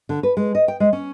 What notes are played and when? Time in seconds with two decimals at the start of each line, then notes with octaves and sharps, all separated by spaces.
0.09 D3
0.23 B4
0.37 G#3
0.55 D#5
0.68 G5
0.80 G#3
0.93 C#4